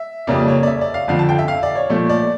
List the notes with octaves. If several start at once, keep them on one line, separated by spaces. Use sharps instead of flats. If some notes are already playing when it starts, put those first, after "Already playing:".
Already playing: E5
F2 C#3 G3 A#3 D5
C#5
D5
E5
D5
F5
F2 D3 F3 F5
A5
G5
E5
F5
D5
C#5
A#2 F3 A3 D5
D5